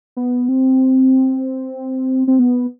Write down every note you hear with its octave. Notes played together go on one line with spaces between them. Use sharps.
B3
C4
C4
B3